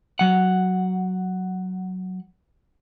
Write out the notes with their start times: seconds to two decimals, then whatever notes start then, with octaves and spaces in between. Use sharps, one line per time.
0.19 F#3 F#5